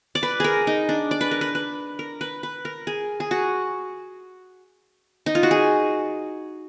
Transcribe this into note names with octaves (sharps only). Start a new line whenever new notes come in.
D5
B4
G#4 A#4
D#4
D4
D5
B4
A#4
B4
B4
A#4
B4
B4
A#4
G#4
G#4
F#4
D#4
F4
F#4
G#4